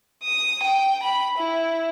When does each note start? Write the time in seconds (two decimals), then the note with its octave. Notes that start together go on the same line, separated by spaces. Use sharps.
0.24 D#6
0.62 G5
1.02 B5
1.36 E4